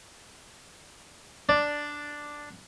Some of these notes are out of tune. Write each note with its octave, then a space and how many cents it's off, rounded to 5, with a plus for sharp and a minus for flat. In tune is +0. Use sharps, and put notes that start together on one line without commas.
D4 +0 D5 +0